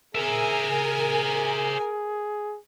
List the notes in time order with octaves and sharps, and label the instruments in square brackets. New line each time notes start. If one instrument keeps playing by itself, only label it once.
[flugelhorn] G#4 [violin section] A#4 G#5 [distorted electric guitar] C5 E5